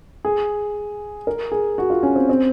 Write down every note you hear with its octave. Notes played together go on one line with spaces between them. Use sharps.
G#4
A#4
G#4
F#4
F4
C#4
C4
C4